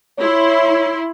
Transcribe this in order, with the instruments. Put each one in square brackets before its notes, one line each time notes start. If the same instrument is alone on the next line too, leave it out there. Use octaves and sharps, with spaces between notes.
[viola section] E4 C6 [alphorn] C#5